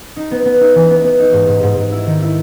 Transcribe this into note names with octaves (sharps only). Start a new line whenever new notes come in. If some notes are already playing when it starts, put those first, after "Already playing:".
D#4
B3
B3
D#4
E3
B3
B3
D#4
G#2
G#2
G#2
G#2
E4
D#3
E4